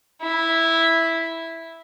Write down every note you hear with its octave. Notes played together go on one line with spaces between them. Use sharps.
E4